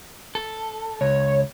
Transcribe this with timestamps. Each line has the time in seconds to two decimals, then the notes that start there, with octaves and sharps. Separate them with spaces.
0.35 A4
1.01 C#2 C#5